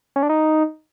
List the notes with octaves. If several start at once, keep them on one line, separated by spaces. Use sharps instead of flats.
C#4
D4
D#4